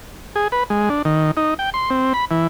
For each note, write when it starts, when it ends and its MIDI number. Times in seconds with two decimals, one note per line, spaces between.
0.36 0.48 68
0.52 0.64 71
0.70 0.89 56
0.89 1.02 62
1.05 1.31 51
1.37 1.54 63
1.59 1.70 79
1.74 1.90 84
1.90 2.13 60
2.14 2.25 83
2.31 2.47 52